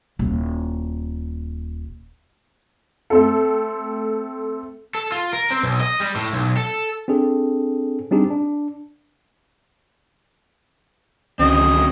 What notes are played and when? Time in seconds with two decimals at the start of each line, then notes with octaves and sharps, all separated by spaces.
0.19 D#1 E4
3.10 A3 C4 A4
4.95 A4
5.12 F4
5.33 A#4
5.51 C4
5.63 B1
5.80 D#5
6.00 G3
6.16 A2
6.33 B1
6.57 A4
7.08 C4 D4 G#4 A4
8.11 G3 C4 D4 D#4 G4 G#4
8.30 D4
11.39 C#2 D3 D#3 F#3 C4 C#4 D#5